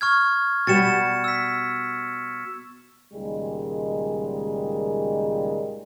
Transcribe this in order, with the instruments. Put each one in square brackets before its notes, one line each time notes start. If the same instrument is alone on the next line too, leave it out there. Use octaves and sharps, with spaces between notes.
[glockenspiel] C#6 F6 G#6
[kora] B2 G3 B3 [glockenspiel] A6 C#7 E7
[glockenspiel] E6 B6
[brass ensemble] C#2 A#2 D#3 G3 G#3